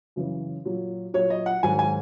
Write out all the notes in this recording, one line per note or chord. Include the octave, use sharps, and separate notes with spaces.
F#2 C#3 E3
A#2 F#3
A#2 F#3 C#5
D#5
F#5
G#2 D#3 F#3 G#5
G#5